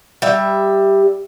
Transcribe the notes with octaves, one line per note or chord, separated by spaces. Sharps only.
G3 E5